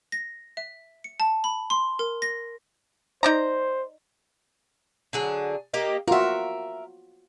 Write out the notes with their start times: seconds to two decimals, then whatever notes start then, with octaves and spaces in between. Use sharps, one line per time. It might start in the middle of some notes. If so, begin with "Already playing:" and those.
0.12 A#6
0.57 E5
1.04 C#7
1.20 A5
1.44 B5
1.70 C6
1.99 A#4
2.22 A#6
3.23 D#4 C5 D5 A#5
5.13 D3 F#3 G#4
5.74 A#3 G4 D#5
6.08 F4 F#4 A#4 E5